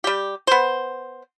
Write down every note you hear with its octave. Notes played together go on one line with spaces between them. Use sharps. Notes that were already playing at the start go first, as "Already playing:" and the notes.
G3 G4
B3 C5